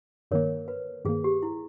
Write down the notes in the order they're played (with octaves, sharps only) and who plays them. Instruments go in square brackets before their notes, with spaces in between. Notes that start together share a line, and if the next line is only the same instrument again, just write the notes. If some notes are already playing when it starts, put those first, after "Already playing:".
[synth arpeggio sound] G2 D#3 A#3 [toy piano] A#4 C#5
[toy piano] B4
[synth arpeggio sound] G2 D#3 A#3 [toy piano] G#4
[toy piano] G4
E4